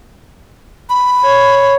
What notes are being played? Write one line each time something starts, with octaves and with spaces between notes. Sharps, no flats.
B5
C#5